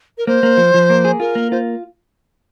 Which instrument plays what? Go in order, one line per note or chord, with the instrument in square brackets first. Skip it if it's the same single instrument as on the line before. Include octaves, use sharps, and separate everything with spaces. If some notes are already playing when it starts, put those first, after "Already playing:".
[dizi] A#4
[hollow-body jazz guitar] A#3 [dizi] C5
[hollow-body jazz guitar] A#3
F3
F3
A#3
G#4
[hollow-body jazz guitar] F4 [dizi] A#4
[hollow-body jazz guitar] A#3
[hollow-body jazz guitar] F4 [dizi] C5